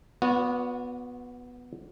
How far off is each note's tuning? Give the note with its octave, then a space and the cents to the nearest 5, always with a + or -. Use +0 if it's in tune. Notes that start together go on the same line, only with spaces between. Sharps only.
B3 +0 F#4 -35 D5 -35